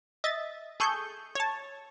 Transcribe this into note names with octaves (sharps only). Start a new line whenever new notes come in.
D#5 E5 A6
G#4 A4 C#6 G6
C#5 A5